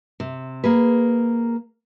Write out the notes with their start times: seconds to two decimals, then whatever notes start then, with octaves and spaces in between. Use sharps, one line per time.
0.20 C3
0.64 A#3 G#4 B4